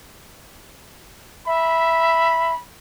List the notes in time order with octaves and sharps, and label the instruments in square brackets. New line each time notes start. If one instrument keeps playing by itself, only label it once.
[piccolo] E5 [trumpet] B5